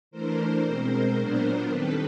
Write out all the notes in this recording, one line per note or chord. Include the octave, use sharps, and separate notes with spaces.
E3 A3 D4 A#4 C5
B2 G#3 C4
A#2 F#3 B3 D4
D#3 G3 C4 A4 B4